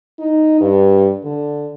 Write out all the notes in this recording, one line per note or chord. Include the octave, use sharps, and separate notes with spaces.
D#4
G2
D3